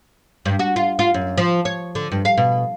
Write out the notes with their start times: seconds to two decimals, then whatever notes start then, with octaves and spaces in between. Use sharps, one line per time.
0.45 G2
0.59 F#4
0.76 F4
0.99 F4
1.14 F#2
1.38 F3
1.65 C#5
1.95 D3
2.11 G2
2.25 F5
2.37 B2